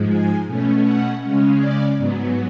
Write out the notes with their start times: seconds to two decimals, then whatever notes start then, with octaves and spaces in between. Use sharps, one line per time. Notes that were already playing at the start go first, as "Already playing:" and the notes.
Already playing: G#2 F3 G#3
0.09 G#5
0.46 B2 A3 C#4
0.84 F#5
1.21 C#3 G#3 C#4
1.59 D5
1.97 G#2 F#3 B3